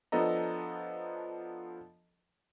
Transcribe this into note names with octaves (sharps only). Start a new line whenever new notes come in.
F3 B3 D4 A4 D#5 A#5